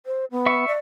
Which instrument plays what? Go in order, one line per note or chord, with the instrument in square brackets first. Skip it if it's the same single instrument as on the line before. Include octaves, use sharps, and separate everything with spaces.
[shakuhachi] C5
B3
[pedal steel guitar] E5 C#6
[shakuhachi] D5